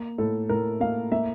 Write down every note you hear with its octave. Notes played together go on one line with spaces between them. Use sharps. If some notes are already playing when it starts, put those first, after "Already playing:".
Already playing: A#3
A2 A4
A2 A#4
A#3 F5
A#3 E5